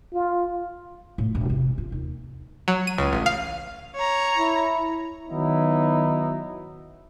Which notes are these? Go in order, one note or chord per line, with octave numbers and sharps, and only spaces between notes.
F4
A2
E1
C3
F4
D#2
F#3
D#7
C#2
A1
F5
C#5 A#5
E4
D#3 F#3 B3 D#4 E4